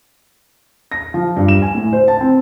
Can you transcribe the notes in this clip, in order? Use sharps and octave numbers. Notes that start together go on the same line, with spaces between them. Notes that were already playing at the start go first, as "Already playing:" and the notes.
A#6
F3
G2
E7
G#5
A2
C5
A5
C4